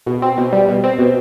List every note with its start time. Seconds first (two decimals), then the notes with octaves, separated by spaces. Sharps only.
0.06 B2
0.22 C4
0.38 B2
0.53 G3
0.68 B2
0.84 C4
0.99 B2